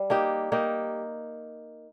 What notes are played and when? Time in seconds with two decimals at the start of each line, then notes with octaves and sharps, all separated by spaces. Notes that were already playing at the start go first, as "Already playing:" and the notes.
Already playing: G3
0.10 A#3 D#4 G4
0.52 A#3 D#4 G4